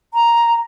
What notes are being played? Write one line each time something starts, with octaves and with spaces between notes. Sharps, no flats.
A#5